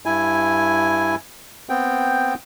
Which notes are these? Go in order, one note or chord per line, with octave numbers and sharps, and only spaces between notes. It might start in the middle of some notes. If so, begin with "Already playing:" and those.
G2 E4 G#5
B3 C4 G5